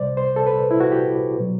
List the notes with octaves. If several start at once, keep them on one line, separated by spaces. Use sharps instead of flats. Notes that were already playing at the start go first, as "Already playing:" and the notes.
Already playing: C2 C3 G3 C5 D5
C5
A4
B4
E4
F#4
G4
B2 F#3